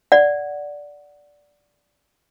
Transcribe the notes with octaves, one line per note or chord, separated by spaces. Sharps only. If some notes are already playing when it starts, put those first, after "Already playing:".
D5 F#5